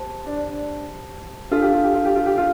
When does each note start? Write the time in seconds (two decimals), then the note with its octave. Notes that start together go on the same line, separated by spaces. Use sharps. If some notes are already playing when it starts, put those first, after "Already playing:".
Already playing: G4 C5 A5
0.26 D4
0.48 D4
1.51 D4 F4 A4 F5
1.62 G4
1.73 F4
1.83 G4
1.94 F4
2.05 G4
2.15 F4
2.26 G4
2.37 F4